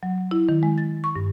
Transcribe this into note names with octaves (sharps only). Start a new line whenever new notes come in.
F#3
E4
D#3
G#3
A6
C#6
G2